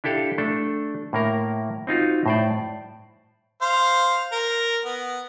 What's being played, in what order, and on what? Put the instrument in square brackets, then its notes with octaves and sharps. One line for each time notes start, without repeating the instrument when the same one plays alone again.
[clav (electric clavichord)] D4 E4 G4 A4 F5
A3 D4 A4
A2 A#3 A#4 A#5
C4 D#4 F4 F#4
A2 C5 D5
[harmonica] C5 F5
A#4
B3